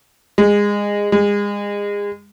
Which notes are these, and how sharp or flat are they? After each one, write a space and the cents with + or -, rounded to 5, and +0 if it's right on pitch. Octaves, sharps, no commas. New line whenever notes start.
G#3 -20
G#3 -30